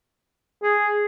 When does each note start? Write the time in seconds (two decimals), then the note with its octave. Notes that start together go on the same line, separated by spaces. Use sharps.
0.63 G#4